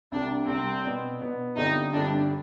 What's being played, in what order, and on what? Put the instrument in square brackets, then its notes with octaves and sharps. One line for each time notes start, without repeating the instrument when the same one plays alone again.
[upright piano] C2 C3 G3 [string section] D4
[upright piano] C2 C3 G3 [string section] C4
[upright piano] B2 B3 D4
B2 B3 D4
[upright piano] G1 G2 D3 G3 C4 [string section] D#4
[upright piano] G1 G2 D3 G3 C4 [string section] D4